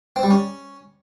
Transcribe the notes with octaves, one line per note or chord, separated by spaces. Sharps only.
C4
G3
C#4